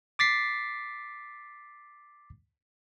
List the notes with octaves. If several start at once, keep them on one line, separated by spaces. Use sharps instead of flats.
D6 A6 B6 C7